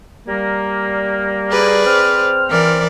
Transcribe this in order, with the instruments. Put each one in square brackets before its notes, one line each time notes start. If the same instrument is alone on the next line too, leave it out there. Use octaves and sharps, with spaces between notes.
[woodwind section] G3 A#3
[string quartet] G#4 B4 D5
[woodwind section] C4 C5 F6
[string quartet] E3 A#4 D5